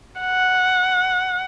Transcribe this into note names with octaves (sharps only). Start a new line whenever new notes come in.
F#5